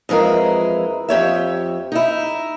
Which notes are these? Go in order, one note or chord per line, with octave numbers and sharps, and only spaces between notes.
F2 E3 G#3 E4 A#4
F2 G4 C#5 E5
D#4 E4